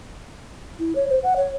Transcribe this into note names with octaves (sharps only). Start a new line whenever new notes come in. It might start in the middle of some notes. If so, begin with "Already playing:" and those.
E4
C#5
C5
F#5
C#5